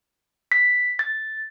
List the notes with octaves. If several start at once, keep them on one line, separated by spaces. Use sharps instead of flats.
B6
A6